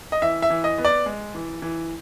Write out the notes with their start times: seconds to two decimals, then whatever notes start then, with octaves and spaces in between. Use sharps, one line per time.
0.12 D#5
0.22 E3 E5
0.42 E5
0.50 E3
0.64 D#5
0.78 B3
0.85 D5
1.06 G#3
1.35 E3
1.62 E3